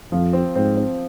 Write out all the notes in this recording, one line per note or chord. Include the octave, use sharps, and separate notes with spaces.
F2 F3
C4
G#2 C4
C4